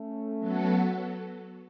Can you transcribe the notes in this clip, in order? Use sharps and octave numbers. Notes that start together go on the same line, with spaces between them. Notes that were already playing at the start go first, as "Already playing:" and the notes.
Already playing: A3 C#4
F#3 B3 F#4 A4